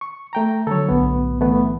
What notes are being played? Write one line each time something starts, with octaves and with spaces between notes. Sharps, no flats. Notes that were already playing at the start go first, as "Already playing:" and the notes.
C#6
A3 G5 A#5
D3 F#3 A4 C#5
B1 A2 B3
E3 A3 B3